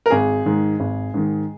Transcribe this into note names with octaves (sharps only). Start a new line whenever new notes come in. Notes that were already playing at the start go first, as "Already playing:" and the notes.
A#4
G#1 G#4
G#2 D#3
G#1
G#2 D#3